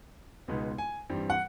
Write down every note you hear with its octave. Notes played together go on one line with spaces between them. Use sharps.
C#2 B2 G#3 B3 D#4
G#5
G2 E3 G3 C4
F#5